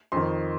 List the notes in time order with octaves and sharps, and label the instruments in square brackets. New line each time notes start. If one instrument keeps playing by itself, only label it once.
[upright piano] F2 D#3 C6